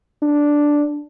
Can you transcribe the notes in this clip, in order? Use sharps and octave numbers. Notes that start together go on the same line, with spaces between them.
D4